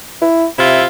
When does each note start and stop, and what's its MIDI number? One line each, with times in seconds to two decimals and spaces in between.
0.21 0.46 64
0.58 0.86 48
0.58 0.85 64
0.58 0.85 65
0.58 0.85 76